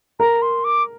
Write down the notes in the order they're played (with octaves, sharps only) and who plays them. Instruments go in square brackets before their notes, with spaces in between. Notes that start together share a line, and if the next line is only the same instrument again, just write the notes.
[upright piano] A#4 [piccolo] A#5
[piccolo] C6
D6